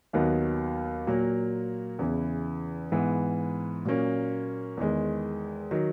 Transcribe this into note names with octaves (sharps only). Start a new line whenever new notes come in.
D#2 D#3 F#3 B3
A#2 F#3 A#3
E2 C#3 E3
G#2 E3 B3
A#2 F#3 A#3 C#4
E2 D#3 G#3
D#3 F#3